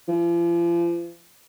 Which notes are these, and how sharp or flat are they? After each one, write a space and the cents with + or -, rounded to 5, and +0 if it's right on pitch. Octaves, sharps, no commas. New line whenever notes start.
F3 -40